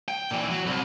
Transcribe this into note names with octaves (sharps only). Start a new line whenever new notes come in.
G5
A#2 E3
F#3
C2